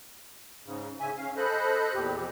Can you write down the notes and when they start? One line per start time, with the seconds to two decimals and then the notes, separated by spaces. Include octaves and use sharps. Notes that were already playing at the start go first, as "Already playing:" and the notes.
0.65 G#2 C#3
1.00 G#2 C#3 E5 G#5
1.17 C#4 F5
1.37 A4 C5 D#5 B5 F#6
1.93 E2 A#2 G4
2.17 B2 F3 C4